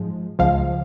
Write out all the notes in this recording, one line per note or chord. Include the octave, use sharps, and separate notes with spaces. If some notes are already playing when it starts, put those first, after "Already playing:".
Already playing: G#2 F3 G#3
C#2 C#3 F3 G#3 F5